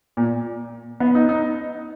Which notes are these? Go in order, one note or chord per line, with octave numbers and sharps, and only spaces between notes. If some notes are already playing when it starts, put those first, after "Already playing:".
A#2
B3
D#4
D#4